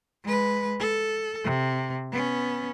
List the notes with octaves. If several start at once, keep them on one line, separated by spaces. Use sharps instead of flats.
G#3 B4
A4
C3
B3 C#4